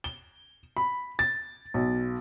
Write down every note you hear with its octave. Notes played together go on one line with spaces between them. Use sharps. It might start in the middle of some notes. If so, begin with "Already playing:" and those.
G7
B5
A6
B1